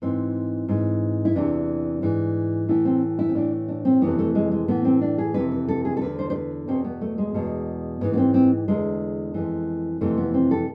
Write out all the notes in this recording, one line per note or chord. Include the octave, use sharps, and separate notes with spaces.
G#2 E3 C4
G#2 E3
E4
E2 C3 E3 D4
G#2 E3
A2 E3 E4
C4
E4
C4
A2 E3 D4
D4
C4
F2 C3 E3 B3
A3
G#3
G#3
A2 E3 B3
C4
D4
G#4
F2 C3 E3 B4
B4
A4
G#4
A4
E2 D3 B4
C5
C5
B4
E2 B2 C4
B3
A3
G#3
E2 B2
G#2 E3 B3
B3
C4
C4
E2 D3 G#3
F2 E3
F2 C3 E3 A3
B3
C4
A4